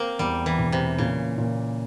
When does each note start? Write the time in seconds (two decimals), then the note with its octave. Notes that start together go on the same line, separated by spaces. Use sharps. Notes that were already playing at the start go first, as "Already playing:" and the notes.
Already playing: A#3 C4
0.19 E2 G3
0.46 E3
0.58 E1
0.72 C3
0.98 A#2 C#3
1.38 A#2